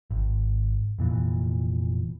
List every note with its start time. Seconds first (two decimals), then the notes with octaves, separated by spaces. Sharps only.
0.11 G#1
0.99 F1 A#2 E3